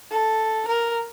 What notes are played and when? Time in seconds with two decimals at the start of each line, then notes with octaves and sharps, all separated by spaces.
0.12 A4
0.68 A#4